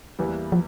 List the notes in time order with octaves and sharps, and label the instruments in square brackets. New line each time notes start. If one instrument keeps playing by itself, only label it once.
[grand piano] E2 E3 G3 A#3 E4
[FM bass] F3